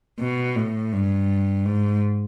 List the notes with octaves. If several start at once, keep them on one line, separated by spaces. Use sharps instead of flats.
B2
A2
G2
G#2